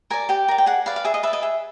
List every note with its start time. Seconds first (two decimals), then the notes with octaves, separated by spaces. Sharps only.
0.10 A#4 D5 G#5
0.29 G4 G5
0.48 A#4 D5
0.58 G5
0.66 G#4 F#5
0.86 B4 D5 F5
0.96 F5
1.05 G#4 E5
1.14 D#5
1.23 B4 E5
1.27 D5
1.33 D#5
1.42 G#4 E5